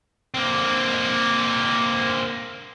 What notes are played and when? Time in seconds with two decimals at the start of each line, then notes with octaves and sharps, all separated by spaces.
0.34 A#3 C4